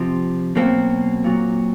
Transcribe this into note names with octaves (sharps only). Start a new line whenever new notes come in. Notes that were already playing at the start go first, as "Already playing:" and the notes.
Already playing: C3 F3
B2 F#3 A#3 C4
A#2 F#3